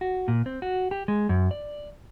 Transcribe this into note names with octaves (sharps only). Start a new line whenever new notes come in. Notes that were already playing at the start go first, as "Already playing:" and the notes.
F#4
A#2
C4
F#4
G4
G#3
F#2
D5